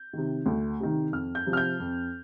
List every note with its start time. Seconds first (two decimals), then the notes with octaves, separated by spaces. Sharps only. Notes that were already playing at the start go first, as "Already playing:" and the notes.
Already playing: G6
0.13 C3 D#3
0.46 D2
0.80 C3 D#3
1.12 F2 F6
1.35 G6
1.46 C3 F3
1.53 F6
1.57 G6
1.80 F2